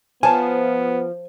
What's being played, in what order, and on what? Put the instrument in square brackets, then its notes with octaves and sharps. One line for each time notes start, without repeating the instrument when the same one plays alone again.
[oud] F3 [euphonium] B3 [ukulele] C#5 A5 [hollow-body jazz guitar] G#5